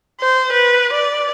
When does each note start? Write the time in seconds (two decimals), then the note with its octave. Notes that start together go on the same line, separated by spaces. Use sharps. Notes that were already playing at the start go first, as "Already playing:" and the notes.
0.20 C5
0.53 B4
0.93 D5